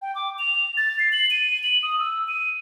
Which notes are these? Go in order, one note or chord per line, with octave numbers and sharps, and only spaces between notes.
G5
D6
F7
A6
C7
F#7
D#7
F#7
D#6
E6
D#7